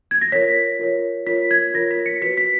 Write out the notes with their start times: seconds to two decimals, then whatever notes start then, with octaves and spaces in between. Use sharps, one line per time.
0.11 G#6
0.22 A#6
0.32 F4 A#4 C#5 B6
0.79 F4 A#4 C#5
1.27 F4 A#4 C#5 B6
1.51 G#6
1.74 F4 A#4 C#5 A#6
1.91 B6
2.06 C#7
2.21 F#4 B4 B6
2.37 B6